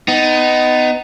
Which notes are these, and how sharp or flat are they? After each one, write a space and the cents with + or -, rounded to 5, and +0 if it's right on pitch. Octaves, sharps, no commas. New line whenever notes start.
B3 +25 D#4 +0